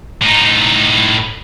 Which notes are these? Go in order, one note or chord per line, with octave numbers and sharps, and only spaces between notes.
A2 D#4